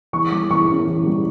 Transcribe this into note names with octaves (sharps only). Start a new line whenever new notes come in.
E3 C#6
G3 D6
E3 C#6
C#4
E3
G3